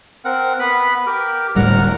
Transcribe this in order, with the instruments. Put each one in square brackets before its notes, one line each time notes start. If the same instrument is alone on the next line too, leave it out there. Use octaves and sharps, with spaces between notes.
[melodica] C4 A#4 F#5
B3 B4 B5
G4 A#4
[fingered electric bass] D1 A2 G3 [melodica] A#4 F#5 A#5